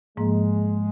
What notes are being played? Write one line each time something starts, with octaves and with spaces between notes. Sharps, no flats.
G#2 F3 G#3 A#3